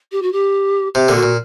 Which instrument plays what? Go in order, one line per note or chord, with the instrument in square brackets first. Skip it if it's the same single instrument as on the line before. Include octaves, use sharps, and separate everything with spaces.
[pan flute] G4
F#4
G4
[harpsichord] C3 [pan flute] G4
[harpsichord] A#2 D3
[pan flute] F#4
[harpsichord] A#2